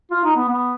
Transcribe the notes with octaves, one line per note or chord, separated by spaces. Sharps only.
F4
D#4
B3
B3